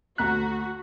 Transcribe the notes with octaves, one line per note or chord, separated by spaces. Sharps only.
D2 F#4 A#5 F#6 B6